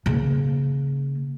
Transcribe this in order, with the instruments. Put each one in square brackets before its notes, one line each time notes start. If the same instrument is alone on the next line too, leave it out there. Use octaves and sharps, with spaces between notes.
[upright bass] C#3 A#3